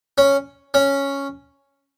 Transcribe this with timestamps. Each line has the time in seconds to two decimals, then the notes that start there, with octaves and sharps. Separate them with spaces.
0.18 C#4
0.74 C#4